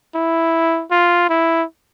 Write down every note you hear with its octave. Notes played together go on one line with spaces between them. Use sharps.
E4
F4
E4